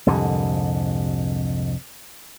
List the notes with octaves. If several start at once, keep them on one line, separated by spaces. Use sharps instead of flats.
C2 F2 G#2 D3